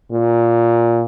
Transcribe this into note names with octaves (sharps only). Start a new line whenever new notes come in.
A#2